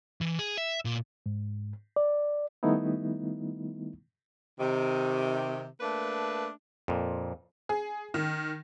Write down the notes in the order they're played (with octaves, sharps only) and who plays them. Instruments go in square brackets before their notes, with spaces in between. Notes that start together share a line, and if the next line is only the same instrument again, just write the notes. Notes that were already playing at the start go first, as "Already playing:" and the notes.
[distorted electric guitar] E3
G#4
E5
A#2
[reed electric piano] G#2
D5
D#3 G3 A3 B3 D#4 E4
[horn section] C3 D#3
A3 A#3 D4 B4
[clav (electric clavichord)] F2 A#2
[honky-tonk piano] G#4
D#3